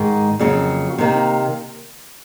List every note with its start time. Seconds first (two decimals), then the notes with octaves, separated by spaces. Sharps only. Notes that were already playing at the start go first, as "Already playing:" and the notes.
Already playing: G#2 D#3 G#3
0.39 F2 C#3 F#3 A#3
0.98 C3 D#3 A#3